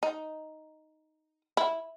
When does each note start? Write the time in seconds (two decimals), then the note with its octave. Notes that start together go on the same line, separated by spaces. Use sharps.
0.03 D#4
1.57 E4